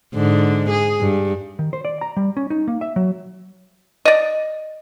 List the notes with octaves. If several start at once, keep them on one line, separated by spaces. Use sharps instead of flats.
G#2 D3
G#4
G2
D#3
C5
D5
A#5
G3
C#4
D#4
A#3
E5
F#3
D5 D#5